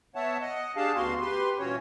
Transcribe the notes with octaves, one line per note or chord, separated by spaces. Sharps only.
B3 C#5 E5 F#5 A5
D#5 F#5
D4 G4 G#4 F5 A5
D2 C#3 B3 F#4 F5 C6
G4 B4 C6
G2 A#2 E3 C#4 F#4 C#5